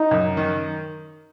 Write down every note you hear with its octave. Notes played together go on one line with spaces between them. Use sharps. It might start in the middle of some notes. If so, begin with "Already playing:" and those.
Already playing: D#4
F#2
D#3